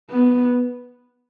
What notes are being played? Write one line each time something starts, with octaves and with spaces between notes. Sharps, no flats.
B3